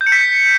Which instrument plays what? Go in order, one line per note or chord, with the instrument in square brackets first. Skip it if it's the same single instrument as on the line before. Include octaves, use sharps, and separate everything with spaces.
[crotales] G6
C#7
B6